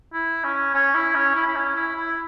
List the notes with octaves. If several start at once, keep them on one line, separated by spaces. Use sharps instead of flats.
E4
C#4
C#4
E4
C#4
E4
E4
C#4
E4
E4